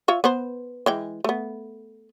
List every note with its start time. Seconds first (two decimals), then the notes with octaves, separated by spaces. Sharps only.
0.08 F4 C#5 E5
0.24 B3 B4 C5
0.86 E3 G#3 G5
1.24 A3 B3